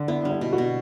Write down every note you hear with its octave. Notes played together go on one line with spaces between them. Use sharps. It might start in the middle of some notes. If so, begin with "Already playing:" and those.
Already playing: D3
B3 E4
G3 D4
E4
B2
F#4
B2